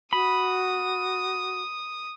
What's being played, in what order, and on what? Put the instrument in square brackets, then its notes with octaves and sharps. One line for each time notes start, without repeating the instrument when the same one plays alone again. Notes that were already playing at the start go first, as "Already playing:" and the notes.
[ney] F#4 [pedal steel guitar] B5 [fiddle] D#6